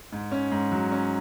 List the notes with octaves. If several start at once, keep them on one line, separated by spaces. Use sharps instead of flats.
G#2
C#4
G#2
F#3
C#4